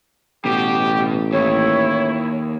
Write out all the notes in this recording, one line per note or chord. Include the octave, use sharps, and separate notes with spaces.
A1 B2 G4
D#2 E4 C#5